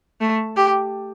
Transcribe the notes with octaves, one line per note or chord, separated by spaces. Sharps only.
A3
G4